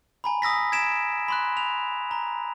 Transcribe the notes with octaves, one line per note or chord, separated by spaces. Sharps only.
G#5 A#5 B5
D#6 E6 A#6 B6
G#6 B6 D7 E7
B5 C6 F#6
F7
A#5